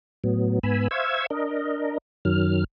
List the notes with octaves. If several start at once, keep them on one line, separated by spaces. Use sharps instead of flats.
A2 F#3 B3
G#2 B3 G#5 B5 E6
C5 E5 F5 C#6 E6 G#6
D4 A#4 D#5
F#2 D#3 F#3 F6